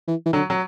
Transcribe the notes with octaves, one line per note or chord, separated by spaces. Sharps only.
E3
E3
D3 F#3
F#3